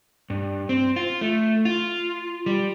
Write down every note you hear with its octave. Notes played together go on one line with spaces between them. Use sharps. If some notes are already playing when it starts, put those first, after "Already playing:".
G2
C4
F4
A3
F4
G3